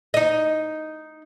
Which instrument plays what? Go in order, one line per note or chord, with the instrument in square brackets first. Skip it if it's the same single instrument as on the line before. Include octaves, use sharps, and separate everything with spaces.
[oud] D#4 D#5